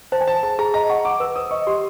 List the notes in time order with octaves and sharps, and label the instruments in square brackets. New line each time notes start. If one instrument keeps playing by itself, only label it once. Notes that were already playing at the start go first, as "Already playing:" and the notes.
[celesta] C5 [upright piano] A5
[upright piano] G#5
[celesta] C5 [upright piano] A5
[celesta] G#4 [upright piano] A5
[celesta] G#4 [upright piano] A#5
[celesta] D#5 [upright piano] A#5
[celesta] F#5 [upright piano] C#6
[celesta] F#5 [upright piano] D6
[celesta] B4 [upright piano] E6
[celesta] C5 [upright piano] D#6
[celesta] D#5 [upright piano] C#6
[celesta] G4 [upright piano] C6